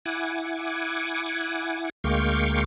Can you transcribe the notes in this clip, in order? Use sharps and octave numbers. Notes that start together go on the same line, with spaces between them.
E4 F#5 G#5 D6
D2 G#3 A#3 F5 G5 C#6